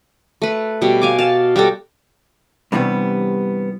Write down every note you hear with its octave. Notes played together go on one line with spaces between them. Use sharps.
A3 B4
B2 G3
F5 G#5 D6
F5 A5
G3 F#4 G4 A4
G2 C3 E3 G3 B3